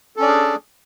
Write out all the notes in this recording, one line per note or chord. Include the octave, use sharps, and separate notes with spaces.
C#4 D4 G#4 A4 D5